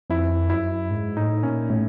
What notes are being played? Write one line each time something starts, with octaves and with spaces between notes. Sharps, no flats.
F2 E4
F#2 E4
G#2
A2 D#4
A#2 C#4
A2